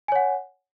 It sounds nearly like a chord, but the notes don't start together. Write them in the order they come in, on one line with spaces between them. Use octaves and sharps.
G#5 C#5 F#5